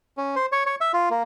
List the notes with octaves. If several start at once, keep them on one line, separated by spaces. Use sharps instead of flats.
C#4
C5
C#5
C#5
E5
F4
A#3